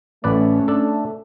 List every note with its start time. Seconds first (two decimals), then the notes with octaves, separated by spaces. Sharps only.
0.24 A1 A3 C#4 B4 D5
0.68 D4 A4